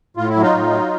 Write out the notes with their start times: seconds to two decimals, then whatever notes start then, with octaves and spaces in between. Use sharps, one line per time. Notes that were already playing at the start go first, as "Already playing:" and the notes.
0.17 A2 F4
0.29 E4
0.36 F#3
0.42 D#4 F4
0.54 A2
0.71 F#3